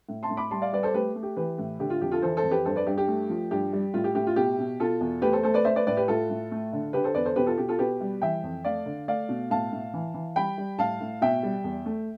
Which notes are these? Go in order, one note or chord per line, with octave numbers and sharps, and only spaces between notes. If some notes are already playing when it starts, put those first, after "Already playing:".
A2
A5 C6
A2
B5 D6
G3 A5 C6
D5 F5
G3 B4 D5
A4 C5
A3 G4 B4
A3
G4
E3 G4 B4
A2
D3 G4
F4
F2 G4
F4 A4
E3 A4 C5
A4 C5
F2
G4 B4
G2 A4 C5
B4 D5
G2 G4
G4
A3
F3
G2 G4
G3
A2 F4
G4
A2 G4
F4
B2 G4
B2
B2 F4 A4
E2
A3 G4 B4
A4 C5
A3 A4 C5
B4 D5
A3 C5 E5
B4 D5
A2 B4 D5
G4 B4
A2 F4 A4
A2
A3
D3
D3 G4 B4
A4 C5
E2 B4 D5
A4 C5
B2 G4 B4
F4 A4
B2 G4
F4 A4
B2 G4 B4
G3
E3 E5 G5
F2
A3 D5 F5
D3
A3 D5 F5
B2
A2 F5 A5
A2
E3
E3
G3 G5 B5
G3
A2 F5 A5
A2
B2 E5 G5
G3
E2
A3